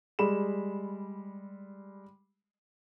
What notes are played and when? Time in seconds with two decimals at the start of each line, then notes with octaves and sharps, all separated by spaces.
0.19 G3 G#3 B5 E7